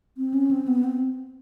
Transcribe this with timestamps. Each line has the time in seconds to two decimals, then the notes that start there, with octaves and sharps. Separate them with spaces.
0.18 C4
0.34 C#4
0.51 C4
0.68 B3
0.84 C4